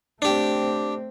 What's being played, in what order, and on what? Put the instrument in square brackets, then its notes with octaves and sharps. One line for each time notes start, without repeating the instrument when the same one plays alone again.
[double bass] A3 C4 [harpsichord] D4 G4